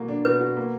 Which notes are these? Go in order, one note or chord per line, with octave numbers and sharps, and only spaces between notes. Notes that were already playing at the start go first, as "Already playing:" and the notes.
Already playing: B2 A#3 F#4
D4
B2 B4
F#4
A#3